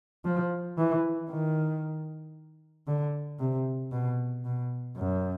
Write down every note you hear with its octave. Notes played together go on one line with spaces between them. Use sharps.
F3
E3
D#3
D3
C3
B2
B2
F#2